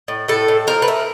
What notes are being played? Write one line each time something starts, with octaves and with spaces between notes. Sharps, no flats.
A2
A2 A4
A2
F3 A#4
B4
A3 A#4